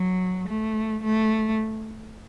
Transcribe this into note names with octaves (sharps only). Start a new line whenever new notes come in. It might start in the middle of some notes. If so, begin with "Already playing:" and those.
Already playing: F#3
A3
A3